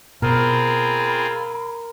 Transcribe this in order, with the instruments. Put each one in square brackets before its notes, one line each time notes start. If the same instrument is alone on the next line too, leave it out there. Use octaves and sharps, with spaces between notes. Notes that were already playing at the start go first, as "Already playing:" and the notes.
[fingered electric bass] B2 [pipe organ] C4 F4 G#4 [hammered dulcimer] A#4 [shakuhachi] B5